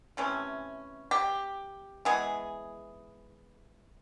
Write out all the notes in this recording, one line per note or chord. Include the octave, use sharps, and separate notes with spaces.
C3 E3 A3 C#4
G4
E3 G#3 B3 G#4